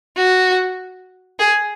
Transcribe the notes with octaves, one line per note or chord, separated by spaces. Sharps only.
F#4
G#4